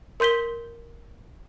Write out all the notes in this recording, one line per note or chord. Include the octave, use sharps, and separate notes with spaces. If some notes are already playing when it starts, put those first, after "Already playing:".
A#4 C6 G6 B6 G7